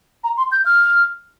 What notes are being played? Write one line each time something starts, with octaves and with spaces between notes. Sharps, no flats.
A#5
C6
G6
F6